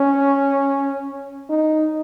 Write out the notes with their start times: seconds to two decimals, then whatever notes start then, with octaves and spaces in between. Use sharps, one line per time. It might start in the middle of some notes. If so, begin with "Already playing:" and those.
Already playing: C#4
1.49 D#4